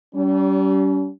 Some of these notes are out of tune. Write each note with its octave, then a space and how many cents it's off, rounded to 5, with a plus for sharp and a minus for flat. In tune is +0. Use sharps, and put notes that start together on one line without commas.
G3 -35 C#4 +40